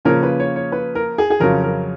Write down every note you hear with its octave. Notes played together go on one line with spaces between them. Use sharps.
C#3 F3 A#3 C#4 F4 A#4
B4
C#5
C#5
B4
A#4
G#4
G#4
F2 C#3 F#3 C#4 F4 A#4
A#4